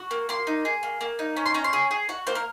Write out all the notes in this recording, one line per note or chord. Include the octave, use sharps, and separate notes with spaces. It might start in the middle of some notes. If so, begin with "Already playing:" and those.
Already playing: F#4
A#3
A#3 C6
D#4
G#4
A#3
A#3
D#4
C#4
C6
C#4 A#5
C6
G#4
G#4
F#4 F#5
A#3 C5
A#4